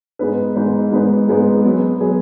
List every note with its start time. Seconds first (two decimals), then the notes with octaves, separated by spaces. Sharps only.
0.19 G#2 G#3 B3 D#4 B4
0.55 G#2 G#3 B3 D#4 B4
0.92 G#2 G#3 B3 D#4 B4
1.28 G#2 G#3 B3 D#4 B4
1.64 F#3 B3 G#4
2.01 F#3 B3 G#4